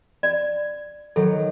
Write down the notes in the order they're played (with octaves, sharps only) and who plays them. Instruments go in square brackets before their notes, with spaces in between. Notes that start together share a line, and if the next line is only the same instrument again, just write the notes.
[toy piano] D5
[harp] D#3 F#3 [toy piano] A4